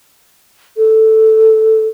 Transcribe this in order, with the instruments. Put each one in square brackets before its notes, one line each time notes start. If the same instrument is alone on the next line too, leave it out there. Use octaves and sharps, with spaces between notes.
[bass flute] A4